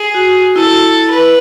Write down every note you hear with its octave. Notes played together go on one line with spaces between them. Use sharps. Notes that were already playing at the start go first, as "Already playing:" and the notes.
Already playing: G#4
F#4
F#4
F#4
E4 A4
B4